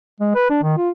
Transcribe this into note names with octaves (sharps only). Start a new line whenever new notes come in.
G#3
B4
D4
D#3
F4